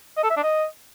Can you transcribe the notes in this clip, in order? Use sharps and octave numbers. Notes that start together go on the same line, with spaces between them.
D#5
A4
E5
D4
D#5